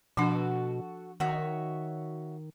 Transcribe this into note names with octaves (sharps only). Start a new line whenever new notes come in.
B2 F3 D4 F#4 A4
D#3 F#4 C#5 E5